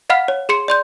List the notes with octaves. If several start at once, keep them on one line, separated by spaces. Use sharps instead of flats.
D#5 F5 F#5 B5 F6 B6
C#5
G#4 C6 C#7
D5 C6 G6